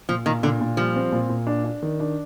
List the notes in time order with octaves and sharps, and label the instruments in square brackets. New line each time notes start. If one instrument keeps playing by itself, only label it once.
[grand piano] A#2 [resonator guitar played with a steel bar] F3
[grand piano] A#2 [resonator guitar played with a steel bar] D#3
[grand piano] A#2 [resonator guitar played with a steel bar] D3
[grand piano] A#2
[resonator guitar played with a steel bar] F3 [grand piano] G3
[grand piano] C4
A#2
A#2
D4
D4
D#3
D4